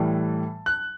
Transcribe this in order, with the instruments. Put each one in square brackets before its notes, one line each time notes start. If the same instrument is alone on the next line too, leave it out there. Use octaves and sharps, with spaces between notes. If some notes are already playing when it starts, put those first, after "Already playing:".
Already playing: [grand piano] A2 E3 G3 A5
F#6